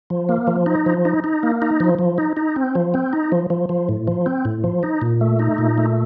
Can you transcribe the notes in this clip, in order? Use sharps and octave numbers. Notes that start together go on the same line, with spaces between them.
F3
A#3
F3
D#4
F3
D#4
D#4
A#3
D#4
F3
F3
D#4
D#4
C4
F3
C4
D#4
F3
F3
F3
A2
F3
C4
A2
F3
D#4
A#2
A3
D#4
A#2
A3